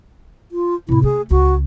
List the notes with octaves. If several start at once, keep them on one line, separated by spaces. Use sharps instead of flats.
F4
A2 C3 E4
A3 G#4
C#2 F#4